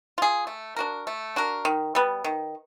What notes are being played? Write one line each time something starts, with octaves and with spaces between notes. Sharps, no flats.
F4 G#4
A3
D4 F#4 A#4
A3
D4 F#4 A#4
D#3
G3 B3
D#3